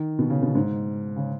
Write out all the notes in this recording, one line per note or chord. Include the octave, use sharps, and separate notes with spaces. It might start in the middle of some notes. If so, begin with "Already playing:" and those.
Already playing: D#3
B2
C#3
B2
G#2
C#3